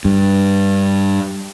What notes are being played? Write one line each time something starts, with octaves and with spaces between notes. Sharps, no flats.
G2